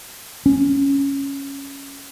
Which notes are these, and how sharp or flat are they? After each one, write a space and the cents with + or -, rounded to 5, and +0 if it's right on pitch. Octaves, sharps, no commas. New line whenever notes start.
C#4 +0